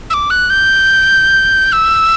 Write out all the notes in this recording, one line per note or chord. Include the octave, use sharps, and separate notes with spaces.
E6
D6
F#6
G6
E6